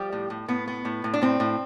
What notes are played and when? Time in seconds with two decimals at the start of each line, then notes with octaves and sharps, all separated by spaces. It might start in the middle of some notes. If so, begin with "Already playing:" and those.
Already playing: F3 G3 G4
0.12 A2
0.30 A2
0.48 A2 B3
0.68 B3
0.85 A2
1.04 A2
1.14 D4
1.22 A2 C4
1.40 A2